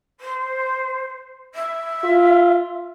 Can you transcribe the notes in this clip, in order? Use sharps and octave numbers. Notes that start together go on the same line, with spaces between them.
C5
E5
F4